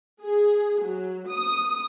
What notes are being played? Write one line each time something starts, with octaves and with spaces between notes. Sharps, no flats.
G#4
F#3
D#6